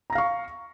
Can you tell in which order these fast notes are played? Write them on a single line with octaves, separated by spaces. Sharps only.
A#5 A#6 F5 C#6